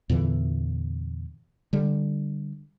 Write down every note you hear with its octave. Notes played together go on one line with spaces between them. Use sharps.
E2 A#2 D3 E3
D3 G3